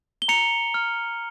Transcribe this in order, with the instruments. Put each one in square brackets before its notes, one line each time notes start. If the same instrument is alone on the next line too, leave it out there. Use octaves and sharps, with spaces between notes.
[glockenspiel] G7
A#5 C#7 F7
F6